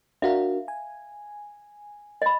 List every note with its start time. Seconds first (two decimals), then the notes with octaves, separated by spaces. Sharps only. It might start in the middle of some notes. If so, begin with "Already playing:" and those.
0.22 D4 F#4 A#4 E5 F5
0.68 G#5
2.22 D#5 B5